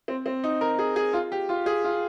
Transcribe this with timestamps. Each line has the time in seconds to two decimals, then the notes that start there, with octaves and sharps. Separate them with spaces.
0.08 C4
0.26 C4
0.44 D#4
0.61 A#4
0.79 G#4
0.96 G#4
1.13 F4
1.32 G4
1.49 F4
1.66 G#4
1.84 F4